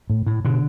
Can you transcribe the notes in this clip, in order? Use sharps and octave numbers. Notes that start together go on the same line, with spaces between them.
A2
A2
B2 D3